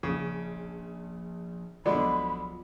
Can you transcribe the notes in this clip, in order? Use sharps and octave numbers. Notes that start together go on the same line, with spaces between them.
A#1 C#3
B1 D3 F3 G#3 D5 B5